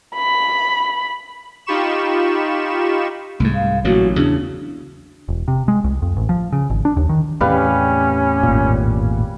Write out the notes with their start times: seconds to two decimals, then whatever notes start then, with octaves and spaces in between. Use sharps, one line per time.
0.15 B5
1.66 D#4 F4 G4 B5 C#6 E7
3.40 C2 G#2 A3
3.54 F5
3.85 A1 A#2 F#3 F#4
4.16 E2 C#3 D4
5.29 E1
5.48 C3
5.68 G#3
5.84 C2
6.02 F2
6.17 A1
6.29 F3
6.53 C#3
6.70 G#1
6.85 D4
6.97 D#2
7.09 D#3
7.41 E2 A2 C3 G3 C#4 B4 F5
8.43 G#1 A#2